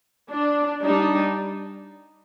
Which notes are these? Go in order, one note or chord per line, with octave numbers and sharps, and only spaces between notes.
D4
G3 D4 D#4